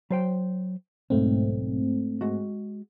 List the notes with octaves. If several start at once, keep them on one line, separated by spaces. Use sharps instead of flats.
F#3 C5 G5
B1 G#2 A3 C4
G#3 F#4